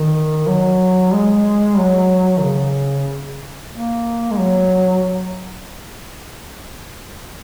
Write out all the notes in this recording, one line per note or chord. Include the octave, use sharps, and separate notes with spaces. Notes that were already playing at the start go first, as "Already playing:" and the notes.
Already playing: D#3
F#3
G#3
F#3
D#3
C#3
A#3
G#3
F#3